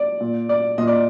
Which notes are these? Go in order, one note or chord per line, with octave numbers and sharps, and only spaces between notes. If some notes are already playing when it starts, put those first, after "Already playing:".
Already playing: D5
A#2
D5
A#2 D#5
D5